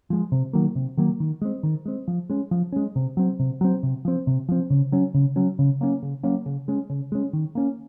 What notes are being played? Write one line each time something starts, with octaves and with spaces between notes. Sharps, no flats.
F3 G#3
C3
D#3 F#3 A#3
C3
D#3 F#3 A#3
D#3
G#3 C4
D#3
G#3 C4
F3
G#3 C#4
F3
G#3 C#4
C3
F#3 C4
C3
F#3 C4
C3
F3 C4
C3
F3 C4
C#3
F#3 C#4
C#3
F#3 C#4
C#3
F#3 A#3 C#4
C#3
F#3 A#3 C#4
C#3
G#3 C#4
C#3
G#3 C#4
D#3
A#3 C#4